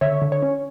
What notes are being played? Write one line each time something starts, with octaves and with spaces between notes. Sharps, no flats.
D3 C#5 E5
D3
C#5
C#4